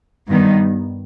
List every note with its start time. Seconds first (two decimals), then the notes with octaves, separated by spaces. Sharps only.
0.28 G2 D#3 G3 B3 D#4